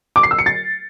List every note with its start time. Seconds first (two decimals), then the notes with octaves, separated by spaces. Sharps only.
0.16 D6
0.23 C7
0.31 E6
0.39 C#7
0.46 A6